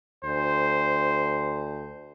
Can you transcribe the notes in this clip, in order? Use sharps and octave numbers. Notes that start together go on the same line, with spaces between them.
D2 C5